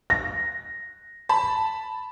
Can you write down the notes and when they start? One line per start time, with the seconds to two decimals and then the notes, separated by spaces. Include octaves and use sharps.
0.10 A#6
1.29 A5 B5